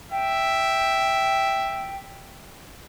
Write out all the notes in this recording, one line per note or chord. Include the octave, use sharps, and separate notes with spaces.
E5 G5